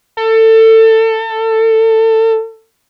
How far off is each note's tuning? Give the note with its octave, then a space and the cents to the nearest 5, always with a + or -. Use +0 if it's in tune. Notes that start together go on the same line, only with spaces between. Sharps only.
A4 +25